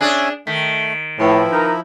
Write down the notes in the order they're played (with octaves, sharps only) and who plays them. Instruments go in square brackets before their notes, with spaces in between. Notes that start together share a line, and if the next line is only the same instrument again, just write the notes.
[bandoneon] C#4 E5 G#5 [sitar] D4 G#4
[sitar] D#3 [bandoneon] A3 [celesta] B6
[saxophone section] A2 [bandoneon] F3 E4 [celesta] B4 G5 B5
[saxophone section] D#4 A#4